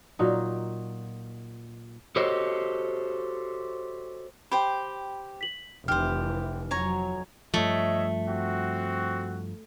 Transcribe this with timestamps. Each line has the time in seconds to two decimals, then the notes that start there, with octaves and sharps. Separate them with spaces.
0.19 A#2 F#3 D#4
2.16 F#4 G4 A4 C5 C#5 D#5
4.52 G4 C5 G5 B5
5.41 B6 F#7
5.88 F1 E3 G4 C5 F6
6.71 F2 F#3 C#5 G#5 A#5
7.54 G2 F3 A3 C#5 D#5 E5
8.26 C4 F#4